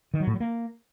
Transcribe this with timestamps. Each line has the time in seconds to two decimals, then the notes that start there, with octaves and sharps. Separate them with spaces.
0.14 D#3
0.20 F#3
0.27 A2
0.34 F#3
0.40 A#3